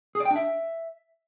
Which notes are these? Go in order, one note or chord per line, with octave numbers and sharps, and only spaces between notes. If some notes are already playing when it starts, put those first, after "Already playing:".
G#4
D5
G5
D4
E5